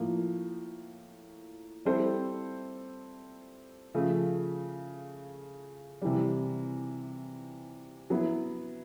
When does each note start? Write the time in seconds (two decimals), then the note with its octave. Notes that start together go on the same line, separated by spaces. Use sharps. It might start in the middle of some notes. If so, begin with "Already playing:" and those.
Already playing: A2 F3 A#3
1.85 G3 C4 E4 A4 C5
3.94 C#3 F3 A3
6.02 C3 E3 G3
8.10 F#3 B3 E4